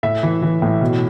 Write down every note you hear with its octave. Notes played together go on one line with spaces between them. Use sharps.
A2 E5
E3
E3
A2
B2